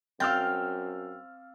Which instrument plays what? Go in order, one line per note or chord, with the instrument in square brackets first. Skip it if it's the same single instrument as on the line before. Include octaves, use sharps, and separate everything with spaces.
[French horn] F#2 [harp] C4 F5 [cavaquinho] G5 [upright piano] E6 F6 A6